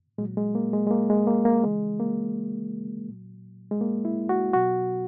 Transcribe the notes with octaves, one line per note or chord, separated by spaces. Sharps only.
A#2 F#3 G#3
G#3
A#3
G#3
G#3
A#3
G#3
A#3
A#3
C#3 E3 G#3
A#3
A#2 F#3
G#3
A#3
E4
F#4
B2 F#3 F#4